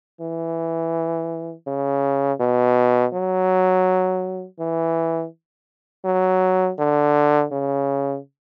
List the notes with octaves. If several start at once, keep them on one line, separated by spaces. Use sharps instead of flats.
E3
C#3
B2
F#3
E3
F#3
D3
C#3